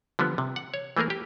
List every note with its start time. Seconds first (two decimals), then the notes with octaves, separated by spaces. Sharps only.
0.19 D3 F3 G3 B3
0.38 C3
0.56 F#5
0.74 C#5
0.97 E3 A3 A#3 G#4 A#4
1.10 G4